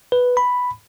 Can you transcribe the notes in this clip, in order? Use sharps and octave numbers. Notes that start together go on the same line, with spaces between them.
B4
B5